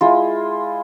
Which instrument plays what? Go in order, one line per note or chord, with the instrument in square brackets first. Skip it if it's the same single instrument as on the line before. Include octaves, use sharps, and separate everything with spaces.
[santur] G#3 E4 F4